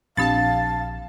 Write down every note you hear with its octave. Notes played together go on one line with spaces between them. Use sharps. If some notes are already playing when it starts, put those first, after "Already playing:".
A#1 C4 D4 G4 F5 A5 A6